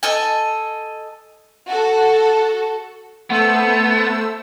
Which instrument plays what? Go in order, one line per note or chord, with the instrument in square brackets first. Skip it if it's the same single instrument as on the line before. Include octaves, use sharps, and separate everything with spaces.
[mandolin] A4 D#5 G#5
[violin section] F#4 A4
[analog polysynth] A3 C5 E6 [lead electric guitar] B3